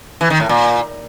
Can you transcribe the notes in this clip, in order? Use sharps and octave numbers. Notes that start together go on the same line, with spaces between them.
E3
D#3
A2
A#2